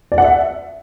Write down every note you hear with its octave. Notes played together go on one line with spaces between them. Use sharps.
D5
F#5
E5